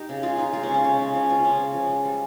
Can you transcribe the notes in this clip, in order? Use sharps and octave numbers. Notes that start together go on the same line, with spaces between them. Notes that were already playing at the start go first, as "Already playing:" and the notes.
Already playing: D#4 G4
C#3
G#3 F4
G#3 D#4
G#3 F4
C#4
C#3
C#4
C#3 C#4
C#3
F3 C#4
F3 F4
C#3 C#4
C#3
F3
G#3
G3